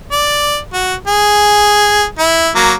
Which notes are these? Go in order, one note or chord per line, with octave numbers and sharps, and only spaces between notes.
D5
F#4
G#4
E4
F#3 A#3